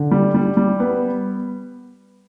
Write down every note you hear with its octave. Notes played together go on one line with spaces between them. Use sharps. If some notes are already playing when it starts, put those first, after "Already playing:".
Already playing: D3
G3
G3
G3
B3